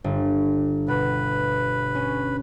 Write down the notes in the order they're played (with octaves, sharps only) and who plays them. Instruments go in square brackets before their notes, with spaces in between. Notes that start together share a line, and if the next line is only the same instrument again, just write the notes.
[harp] G1
[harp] B2 [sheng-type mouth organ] B4
[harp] C#4